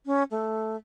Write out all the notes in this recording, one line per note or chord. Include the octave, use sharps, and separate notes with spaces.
C#4
A3